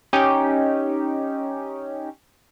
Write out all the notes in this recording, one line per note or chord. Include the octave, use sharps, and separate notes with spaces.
C#4 D#4 G4